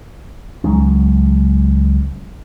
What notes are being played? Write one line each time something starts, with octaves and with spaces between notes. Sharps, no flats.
C#2 F#3 G#3 C#4